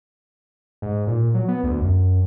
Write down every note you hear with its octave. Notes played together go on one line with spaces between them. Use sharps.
G#2
A#2
F#3
B3
D2
F#2